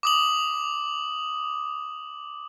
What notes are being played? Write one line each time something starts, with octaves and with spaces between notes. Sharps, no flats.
D6 D#6 F#7